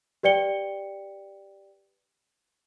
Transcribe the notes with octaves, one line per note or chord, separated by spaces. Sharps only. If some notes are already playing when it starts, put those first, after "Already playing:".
G4 B4 D5 G5 C#7 G7